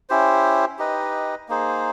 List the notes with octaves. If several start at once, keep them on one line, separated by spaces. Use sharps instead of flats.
C#4 E4 G4 C5
D#4 G4 B4 D#5
A#3 D#4 G#4 C5